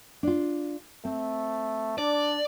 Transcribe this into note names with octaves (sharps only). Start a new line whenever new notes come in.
D4 F4
A3 C4
D4 D5